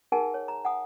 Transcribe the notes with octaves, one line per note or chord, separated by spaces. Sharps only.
D#4 G#4 A#4 F#5 G#5 A5
C#5
A#5
F#5 G#5 D#6